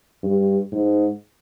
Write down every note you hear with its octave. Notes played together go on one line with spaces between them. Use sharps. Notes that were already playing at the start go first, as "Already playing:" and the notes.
G2
G#2